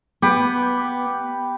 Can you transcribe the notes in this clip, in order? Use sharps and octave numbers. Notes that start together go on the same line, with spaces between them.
B3 G4 B4